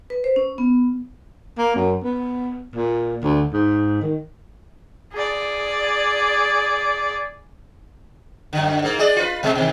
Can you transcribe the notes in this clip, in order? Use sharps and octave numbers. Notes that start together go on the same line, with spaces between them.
B4
C5
C#4
B3
A#3
F#2
B3
A#2
D2
G#2
D#3
G#4 D5
F#2 D3
G#2 A#3
G#3 G#4 D5
F4 B4
B2 G#3
B2 D#3